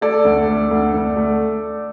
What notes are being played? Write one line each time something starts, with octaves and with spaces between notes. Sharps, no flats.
A3 A4 D5
D2
A3
D2
D2
A3